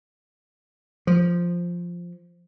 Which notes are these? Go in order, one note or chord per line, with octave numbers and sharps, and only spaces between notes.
F3